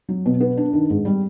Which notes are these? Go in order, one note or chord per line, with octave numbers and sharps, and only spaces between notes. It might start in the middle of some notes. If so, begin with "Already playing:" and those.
F#3
B2
B3
D4
D#3
G#2
G3